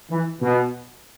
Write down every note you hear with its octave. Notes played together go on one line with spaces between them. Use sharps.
E3
B2